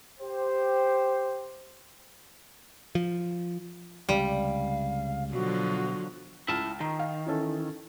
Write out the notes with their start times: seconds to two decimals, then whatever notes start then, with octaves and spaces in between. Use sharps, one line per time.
0.20 G4 C5
2.95 F3
4.09 C#2 C3 G3 F5
5.33 B2 D3 F3 F#3 F#4
6.48 C#2 E4 A5 F6
6.80 D#3 A#5
6.99 F5
7.26 E3 C#4 A4